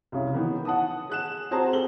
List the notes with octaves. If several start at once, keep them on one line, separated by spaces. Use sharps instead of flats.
C2 C#3
D#3 E3 B3
F#5 A5 D#6
G#4 F#6 E7
C4 F#4 G#4 C5 A5 A#5
G4 A4 F#7 G7